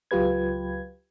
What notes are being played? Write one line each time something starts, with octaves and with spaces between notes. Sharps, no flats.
C#2 F#3 F4 G4 B4 G#6